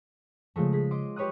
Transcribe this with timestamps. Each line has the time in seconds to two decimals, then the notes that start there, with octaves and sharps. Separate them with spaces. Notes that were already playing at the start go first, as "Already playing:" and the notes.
0.56 C#3 F3 G#3 A3
0.73 G#4 B6
0.91 D#5 C6 D6
1.16 G4 B4 C#5 C#6 D#6 F#6